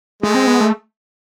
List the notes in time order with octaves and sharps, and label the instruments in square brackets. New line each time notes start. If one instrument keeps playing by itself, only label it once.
[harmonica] G#3 [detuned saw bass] A3
[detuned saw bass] C4
B3
A3